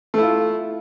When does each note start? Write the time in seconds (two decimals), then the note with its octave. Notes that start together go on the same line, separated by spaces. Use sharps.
0.14 A3
0.18 E4
0.23 F4